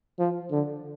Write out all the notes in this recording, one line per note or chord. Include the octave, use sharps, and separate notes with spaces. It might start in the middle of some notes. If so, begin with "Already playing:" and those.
F3
D3